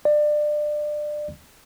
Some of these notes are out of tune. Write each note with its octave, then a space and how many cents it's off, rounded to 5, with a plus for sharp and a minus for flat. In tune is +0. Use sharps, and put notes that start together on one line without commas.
D5 +25